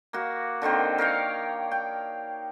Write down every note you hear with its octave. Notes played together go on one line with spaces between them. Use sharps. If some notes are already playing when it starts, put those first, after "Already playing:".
A#3 F#4
D3 D#3 A#3 C4
A#4 C#5 F5 G5
G5